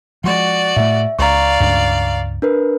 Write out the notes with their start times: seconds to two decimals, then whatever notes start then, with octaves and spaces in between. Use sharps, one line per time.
0.24 F3 G#3 F#4 D5
0.76 A2 A3 E5
1.19 C#2 D5 F5 A#5 C#6
1.60 C#2 G2
2.42 D4 A#4 B4